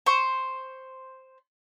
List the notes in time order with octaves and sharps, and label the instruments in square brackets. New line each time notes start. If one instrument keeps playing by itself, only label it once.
[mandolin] C5 C#6